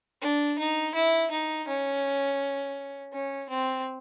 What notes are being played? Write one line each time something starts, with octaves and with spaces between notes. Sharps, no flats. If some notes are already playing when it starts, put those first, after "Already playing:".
D4
D#4
E4
D#4
C#4
C#4
C4